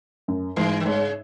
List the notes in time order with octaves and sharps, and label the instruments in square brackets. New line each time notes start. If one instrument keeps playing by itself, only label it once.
[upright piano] F#2
[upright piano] G#2 [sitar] E3
[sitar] D#3
[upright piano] G#2 [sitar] C#3